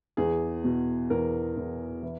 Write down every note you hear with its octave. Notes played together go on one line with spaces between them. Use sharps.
E2 G#4
B2
E2 A#4
E2
E3